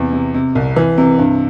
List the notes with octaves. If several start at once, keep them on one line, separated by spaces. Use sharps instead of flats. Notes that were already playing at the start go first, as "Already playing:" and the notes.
Already playing: E2 C3
C3
C3
C2
E3
C3
G2